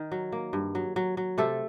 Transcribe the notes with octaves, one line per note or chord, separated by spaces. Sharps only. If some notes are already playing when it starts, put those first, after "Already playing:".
Already playing: D#3
F#3
A#3
G2
F#3
F#3
F#3
C3 A3 A4